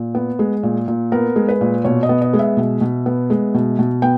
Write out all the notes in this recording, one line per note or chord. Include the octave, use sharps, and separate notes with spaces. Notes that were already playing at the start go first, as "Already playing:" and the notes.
Already playing: A#2
B3
G#3
A#2
A#2
B3 A#4
G#3
B4
A#2
B2 C#5
D#5
B3
D#5
G#3
E5
B2
B2
B3
G#3
B2
B2
B3 G5